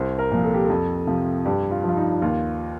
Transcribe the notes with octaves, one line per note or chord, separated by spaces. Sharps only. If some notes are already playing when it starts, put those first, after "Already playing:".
Already playing: C2 C5
A#4
A#2 F3
A4
G4
F2 A4
C3 F3
G2 G4
F4
F3 F4
D#4
D#2 F4